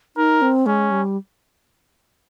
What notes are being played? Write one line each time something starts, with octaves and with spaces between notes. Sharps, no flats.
D#4 A#4
C4
G#3 C#4
G3